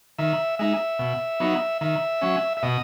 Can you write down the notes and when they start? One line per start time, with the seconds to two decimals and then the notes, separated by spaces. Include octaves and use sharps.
0.18 D#3 E5
0.59 G#3 D#4 E5
0.99 B2
1.40 F#3 B3 D#4
1.81 D#3 E5
2.22 F#3 C#4
2.57 E5
2.63 B2 D#5